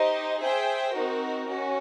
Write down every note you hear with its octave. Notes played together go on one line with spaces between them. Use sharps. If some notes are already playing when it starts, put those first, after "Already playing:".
Already playing: D#4 G4 C5 D#5
G#4 C5 E5 G5
C4 D#4 F#4 A#4
C#4 F#4